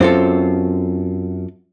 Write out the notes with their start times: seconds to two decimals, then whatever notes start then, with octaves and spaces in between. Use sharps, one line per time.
0.01 F#2 C4 F4 A4